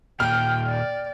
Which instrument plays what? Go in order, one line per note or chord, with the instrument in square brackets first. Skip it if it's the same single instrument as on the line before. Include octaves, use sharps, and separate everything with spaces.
[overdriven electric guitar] D#2 A#2 [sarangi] G5 [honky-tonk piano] F6
[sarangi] D5